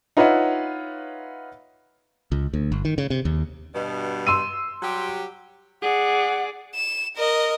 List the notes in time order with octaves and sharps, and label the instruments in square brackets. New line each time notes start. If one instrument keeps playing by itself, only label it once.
[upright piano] D#4 F4 B4 C#5 E5 F#5
[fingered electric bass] C#2
D2
G1
D#3
C#3
C3
D#2
[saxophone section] G2 B2
[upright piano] C6 E6 D#7
[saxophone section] F#3 G3 G4
[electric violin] G#4 D5 [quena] F#5
[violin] E7
A#4 D#5